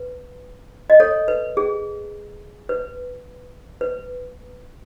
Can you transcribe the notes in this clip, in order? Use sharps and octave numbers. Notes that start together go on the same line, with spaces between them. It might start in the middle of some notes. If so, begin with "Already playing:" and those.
Already playing: B4
D#5
A4 C#5
B4
G#4
B4
B4